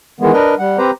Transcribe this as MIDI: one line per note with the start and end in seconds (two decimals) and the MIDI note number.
0.20 0.32 51
0.20 0.32 52
0.20 0.32 56
0.20 0.32 59
0.33 0.55 62
0.33 0.55 70
0.33 0.55 71
0.33 0.55 75
0.59 0.78 55
0.59 0.78 78
0.78 0.91 60
0.78 0.91 67
0.78 0.91 71
0.78 0.91 72
0.78 0.91 82